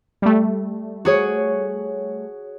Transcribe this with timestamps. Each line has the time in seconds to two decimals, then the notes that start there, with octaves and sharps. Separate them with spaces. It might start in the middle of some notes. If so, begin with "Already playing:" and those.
0.22 G3 A3
1.05 F#4 G#4 C#5